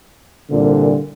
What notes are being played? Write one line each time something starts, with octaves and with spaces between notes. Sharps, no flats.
C2 A#2 D3